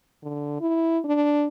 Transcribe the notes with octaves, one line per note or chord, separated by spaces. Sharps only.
D3
E4
D4